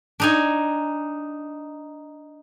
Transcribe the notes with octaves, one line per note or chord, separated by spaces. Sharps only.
D4 D#4 G#5